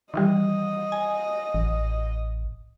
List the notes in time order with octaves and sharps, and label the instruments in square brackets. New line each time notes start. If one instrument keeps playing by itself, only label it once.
[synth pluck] D#3 E3 G3 [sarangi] D#5
[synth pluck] G#5
[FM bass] A1